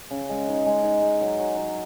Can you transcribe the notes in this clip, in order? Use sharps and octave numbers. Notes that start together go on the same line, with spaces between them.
C#3
G#3
D#4
G#3
D#4
G#3
F#3
F#3
F#3